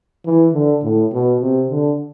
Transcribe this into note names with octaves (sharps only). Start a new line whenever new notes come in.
E3
D3
A2
B2
C3
D3